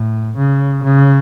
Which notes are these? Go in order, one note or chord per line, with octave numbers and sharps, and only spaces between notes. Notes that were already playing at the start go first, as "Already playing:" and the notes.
Already playing: A2
C#3
C#3